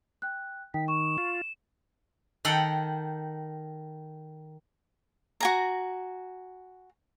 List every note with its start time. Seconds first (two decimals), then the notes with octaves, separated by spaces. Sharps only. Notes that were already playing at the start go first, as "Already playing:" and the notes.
0.22 G5 F#6
0.74 D#3 G5 B6
0.88 C#6 E7
1.18 F4
2.45 D#3 A4 F#5 G5
5.40 F#4 G#5 A#5